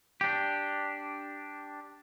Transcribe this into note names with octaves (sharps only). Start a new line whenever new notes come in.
D4 G4